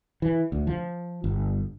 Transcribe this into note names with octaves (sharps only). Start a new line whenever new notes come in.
E3
D2
F3
G1